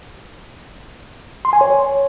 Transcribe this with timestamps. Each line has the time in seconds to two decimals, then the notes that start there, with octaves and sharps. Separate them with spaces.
1.45 C6
1.53 G#5
1.61 C#5